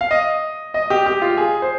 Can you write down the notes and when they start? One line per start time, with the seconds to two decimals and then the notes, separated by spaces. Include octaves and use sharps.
0.01 F5
0.11 D#5
0.74 D#5
0.90 G4
1.06 G4
1.22 F4
1.37 G#4
1.62 C5